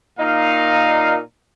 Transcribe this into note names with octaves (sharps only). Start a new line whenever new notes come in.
A#2 D#4 F5